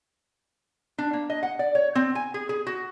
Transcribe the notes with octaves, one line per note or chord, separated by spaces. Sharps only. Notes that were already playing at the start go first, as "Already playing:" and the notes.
D4
A#3
D#5
F#5
D5
C#5
C4
G#5
G#4
G#4
F#4